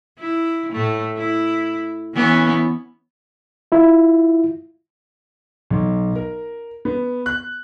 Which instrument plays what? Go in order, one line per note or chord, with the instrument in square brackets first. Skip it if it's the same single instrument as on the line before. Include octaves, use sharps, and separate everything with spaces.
[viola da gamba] E4
A2 A3
E4
E3 B3 C#4
[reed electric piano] E4 F4
[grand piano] B1
A#4
B3
F#6